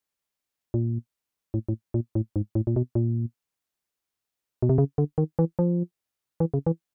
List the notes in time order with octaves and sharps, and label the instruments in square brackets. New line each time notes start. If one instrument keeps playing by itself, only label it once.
[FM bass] A#2
A2
A2
A#2
A2
G#2
A2
A#2
B2
A#2
B2
C3
C#3
D3
D#3
E3
F3
E3
C#3
E3